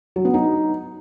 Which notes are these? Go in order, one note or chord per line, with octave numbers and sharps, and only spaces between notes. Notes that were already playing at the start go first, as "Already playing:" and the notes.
F#3
B3
D#4